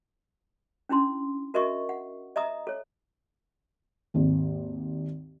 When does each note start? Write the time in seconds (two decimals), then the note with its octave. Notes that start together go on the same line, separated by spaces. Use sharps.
0.89 C#4 D4 E4 C6
1.54 F#4 A#4 D#5 E5 C#6
1.89 F#5
2.36 D#5 E5 A#5 D#6
2.67 A4 C#5
4.14 G#1 D#2